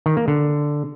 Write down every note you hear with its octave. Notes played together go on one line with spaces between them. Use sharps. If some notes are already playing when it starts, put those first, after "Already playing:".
D#3
A#3
D3